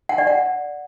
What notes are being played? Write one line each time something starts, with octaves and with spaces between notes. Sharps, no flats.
F#5
D5
F#5